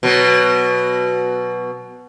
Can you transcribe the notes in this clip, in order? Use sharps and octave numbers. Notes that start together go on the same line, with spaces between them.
B2 F#3